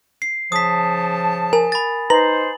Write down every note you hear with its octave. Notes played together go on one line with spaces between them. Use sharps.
C7
C#3 F3 A5 D#6 B6
A#4 G#5
B5 A6
D#4 B4 C5 A#5 F#7